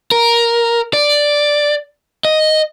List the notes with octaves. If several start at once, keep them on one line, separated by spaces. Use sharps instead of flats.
A#4
D5
D#5